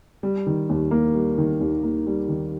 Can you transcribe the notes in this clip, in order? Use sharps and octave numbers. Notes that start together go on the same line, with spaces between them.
G3
D#3
D#2
A#3
G3
D#3
D#2
A#3
G3
D#3